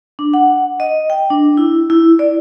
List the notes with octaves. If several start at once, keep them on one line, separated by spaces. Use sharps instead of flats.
D4
F#5
D#5
G5
D4
E4
E4
D5